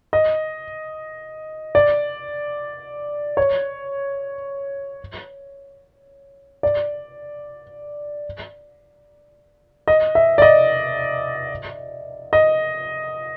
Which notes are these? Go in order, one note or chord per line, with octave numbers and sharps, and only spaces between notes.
D#5
D5
C#5
D5
D#5
E5
D5
D#5
D#5